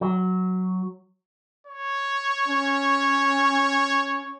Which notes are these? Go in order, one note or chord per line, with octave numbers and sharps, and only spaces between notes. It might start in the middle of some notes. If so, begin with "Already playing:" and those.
F#3
C#5
C#4